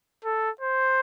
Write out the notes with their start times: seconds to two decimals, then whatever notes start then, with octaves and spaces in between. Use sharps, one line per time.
0.25 A4
0.61 C5